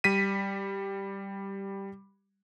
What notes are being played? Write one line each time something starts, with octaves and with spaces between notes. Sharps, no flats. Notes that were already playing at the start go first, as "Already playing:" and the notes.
G3 B6 D#7